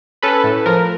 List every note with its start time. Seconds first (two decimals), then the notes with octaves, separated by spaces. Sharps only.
0.23 C#4 A4 B4
0.44 A2
0.66 F3 A#4